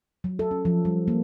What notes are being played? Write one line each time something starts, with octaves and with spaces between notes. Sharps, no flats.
F#3
A4
C#4
F3
G3
A#3